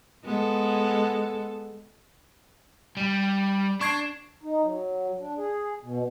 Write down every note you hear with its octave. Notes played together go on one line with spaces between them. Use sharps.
G#3 B3 A4
G3
D4 C#6 G#6 C7
D#4
F#3
D4
G#4
B2